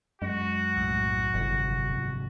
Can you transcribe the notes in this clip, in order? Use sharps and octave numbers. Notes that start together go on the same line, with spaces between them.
F#2 G#3 F#4
B1 A2
G1 G#2 C3 F3